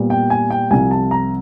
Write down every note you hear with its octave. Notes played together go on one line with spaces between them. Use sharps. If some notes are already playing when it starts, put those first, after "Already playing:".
Already playing: A#2 G3 B3
G5
G#5
G5
C2 C3 F3 G#5
A5
A#5